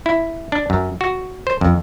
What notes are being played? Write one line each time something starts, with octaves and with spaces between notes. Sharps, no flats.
E4
D4
F#2
F#4
C5
F2